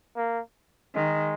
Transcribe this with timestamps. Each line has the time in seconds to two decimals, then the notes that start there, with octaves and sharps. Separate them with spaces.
0.16 A#3
0.95 D#3 G#3